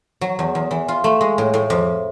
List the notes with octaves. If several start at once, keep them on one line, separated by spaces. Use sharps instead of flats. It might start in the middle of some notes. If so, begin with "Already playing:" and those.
F#3
E2
E2
E3
F4
A3
G#3
A2
A2
F2